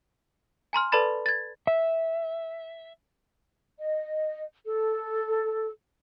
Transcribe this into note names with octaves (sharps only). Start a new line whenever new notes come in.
G#5 A#5 C6 F6
A4 B4 D5 A5 B5 A6
G#6 A6
E5
D#5
A4